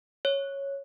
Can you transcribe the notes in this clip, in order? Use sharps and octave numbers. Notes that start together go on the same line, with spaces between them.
C#5